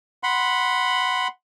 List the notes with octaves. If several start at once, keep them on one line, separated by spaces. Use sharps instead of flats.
F#5 B5 C6